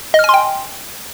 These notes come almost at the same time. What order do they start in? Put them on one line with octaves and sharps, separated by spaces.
D#5 F6 G#5 C6 G5